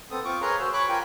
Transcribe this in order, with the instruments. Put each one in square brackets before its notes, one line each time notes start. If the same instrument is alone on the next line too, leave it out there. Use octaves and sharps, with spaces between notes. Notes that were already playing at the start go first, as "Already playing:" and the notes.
[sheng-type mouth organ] B3 C4 A4 D#6
C4 F4 C#6 D6
G#4 A#4 B4 C#5 A#5 C6
F#4 C5 E6
C#5 B5 C#6 D6 F#6
F4 G4 A#4 G5 G#5